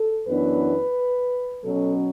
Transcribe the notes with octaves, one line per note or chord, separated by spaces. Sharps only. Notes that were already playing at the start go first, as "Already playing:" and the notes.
Already playing: A4
F#2 E3 B3 D4 B4
B2 F#3 C#4 A4